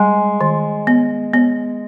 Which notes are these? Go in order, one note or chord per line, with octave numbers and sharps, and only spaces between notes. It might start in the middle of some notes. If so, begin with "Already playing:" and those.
Already playing: G3 G#3
D#3
B3
B3